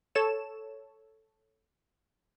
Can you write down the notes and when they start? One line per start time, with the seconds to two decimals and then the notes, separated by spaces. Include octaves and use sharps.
0.15 A4 C#5 E7